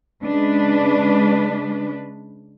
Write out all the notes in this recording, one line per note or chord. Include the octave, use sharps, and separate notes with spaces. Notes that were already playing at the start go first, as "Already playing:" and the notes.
C#3 G#3 D4 B4